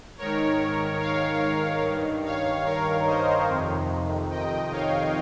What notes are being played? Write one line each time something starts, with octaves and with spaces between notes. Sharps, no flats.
G#2 D#3 A#4 C#5
C#5 F5
G2 D#3
C#5 F5
A#4 C#5
C5 D#5
F2 C3 D#3
D#5 G5
C#5 F5